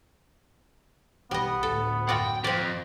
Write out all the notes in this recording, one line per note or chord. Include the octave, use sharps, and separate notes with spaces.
B1 G3 B3 D#5
D2 A2 A4
F#2 F4 F#4 D5 F#5 G5
F2 C4 D5